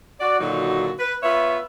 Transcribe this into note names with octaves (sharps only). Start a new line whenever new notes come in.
F#4 D5
A#2 D3 D#3 F#3 D#4 F#4
B4
B3 F4 B4 C#5 E5